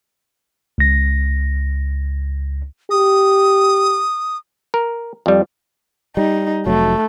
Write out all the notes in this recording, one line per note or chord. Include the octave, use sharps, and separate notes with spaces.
C#2 A#6
G4 D#6
A#4
F2 G3
G3 D#4
F1 F#3 A3